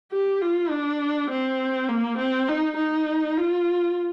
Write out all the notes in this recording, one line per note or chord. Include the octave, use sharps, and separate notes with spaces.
G4
F4
D4
C4
A#3
C4
D#4
D#4
F4